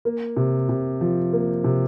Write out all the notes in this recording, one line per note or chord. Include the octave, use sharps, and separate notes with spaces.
A#3
C3
C3
F3
A#3
C3